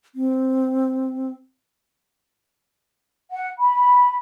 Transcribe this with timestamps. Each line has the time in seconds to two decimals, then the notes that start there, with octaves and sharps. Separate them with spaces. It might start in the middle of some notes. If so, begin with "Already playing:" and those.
0.15 C4
3.31 F#5
3.59 B5